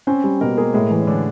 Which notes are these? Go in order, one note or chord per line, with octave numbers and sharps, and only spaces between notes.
C4 C#4 C5
G3
B2 A#3 A#4
G#3 A#3 G#4
A2 G#3 G#4
E3
C#4
A2 D3 D4